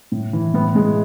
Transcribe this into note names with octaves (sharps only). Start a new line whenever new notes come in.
A2
E3
A2 B3
A2 G#3